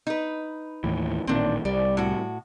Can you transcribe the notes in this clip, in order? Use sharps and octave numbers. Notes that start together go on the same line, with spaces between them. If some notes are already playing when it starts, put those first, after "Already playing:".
D#4 B4
D#2 A2 E3
A1 A#2 D#3 C4 D4
C2 G3 D5
A2 F#4